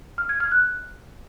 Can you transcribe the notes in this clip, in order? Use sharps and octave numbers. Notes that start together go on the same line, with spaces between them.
F6
G#6
F6
F#6